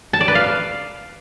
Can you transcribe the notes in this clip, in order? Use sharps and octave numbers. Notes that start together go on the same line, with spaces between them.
A5
D5
B4
F5